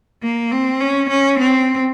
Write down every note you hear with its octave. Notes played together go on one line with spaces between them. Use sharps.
A#3
C4
C#4
C#4
C4